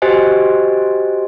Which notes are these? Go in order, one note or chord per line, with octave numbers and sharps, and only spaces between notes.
F#4 G4 C5 D#5 G#5